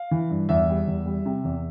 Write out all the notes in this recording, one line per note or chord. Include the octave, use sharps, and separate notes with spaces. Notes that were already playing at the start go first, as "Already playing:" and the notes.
Already playing: F5
E3
G2
E2 E5
G3
E2
G3
C3
E2